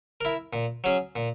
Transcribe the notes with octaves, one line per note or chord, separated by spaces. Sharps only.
E4 A#4
A#2
F#3 C#4 G#4
A#2